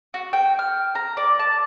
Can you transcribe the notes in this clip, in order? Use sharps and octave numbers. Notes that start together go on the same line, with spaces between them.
F#4
G5
F6
A#5
D5
A5